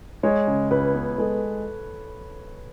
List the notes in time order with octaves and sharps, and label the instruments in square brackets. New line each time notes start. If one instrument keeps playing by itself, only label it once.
[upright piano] G#3 [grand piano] C#5
[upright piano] C#3
[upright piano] C#2 [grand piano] B4
[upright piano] B3
[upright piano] G#3 [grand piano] A4